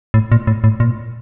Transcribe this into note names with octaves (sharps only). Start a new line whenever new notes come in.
A2
A#2
A2
A2
A#2